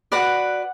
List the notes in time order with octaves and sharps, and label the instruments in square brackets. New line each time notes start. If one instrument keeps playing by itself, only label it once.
[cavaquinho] F#4 B4 D5 F#5